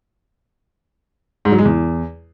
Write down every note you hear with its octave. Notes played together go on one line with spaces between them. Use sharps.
G#2
F#3
G#3
E2